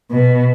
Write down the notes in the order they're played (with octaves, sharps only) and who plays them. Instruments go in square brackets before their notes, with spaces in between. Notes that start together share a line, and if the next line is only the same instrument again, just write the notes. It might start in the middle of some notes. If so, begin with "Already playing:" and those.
[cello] B2